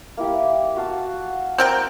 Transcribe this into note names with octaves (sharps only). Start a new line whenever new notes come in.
A#3 E4 G4
F#4 F5 A5
C4 A#4 G5